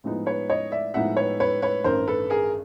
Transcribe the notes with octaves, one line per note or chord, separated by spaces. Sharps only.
A2 F3 G#3 B3 D#4
B4 C#5
C#5 D#5
D5 E5
A2 F3 G#3 B3 D#4 E5 F#5
B4 C#5
B4 C#5
B4 C#5
A1 G2 D#3 A#4 C5
A4 B4
G#4 A#4